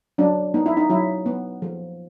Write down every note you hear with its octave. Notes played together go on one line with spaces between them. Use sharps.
F#3 D4
B3 D#4
E4
D#4
F#3 E4
B3
F3